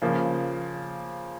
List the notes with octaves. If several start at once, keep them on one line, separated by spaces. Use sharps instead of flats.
C#3 F3 A#3